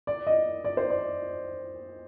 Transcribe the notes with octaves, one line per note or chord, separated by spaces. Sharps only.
D5
D#5
D5
C5
D5